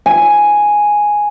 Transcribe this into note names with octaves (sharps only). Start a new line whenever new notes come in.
G#5